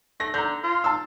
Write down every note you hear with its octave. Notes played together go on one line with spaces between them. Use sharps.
A3 A#6
D3 A#5 G6
F4
A5 E6